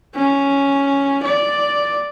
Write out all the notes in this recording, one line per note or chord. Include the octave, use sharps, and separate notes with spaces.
C#4
D5